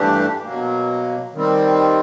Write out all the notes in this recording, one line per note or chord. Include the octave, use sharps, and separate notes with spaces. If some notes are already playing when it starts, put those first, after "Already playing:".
Already playing: G2 E3 A3 D4 G4
B2 F#3 A#3
D#3 G3 C4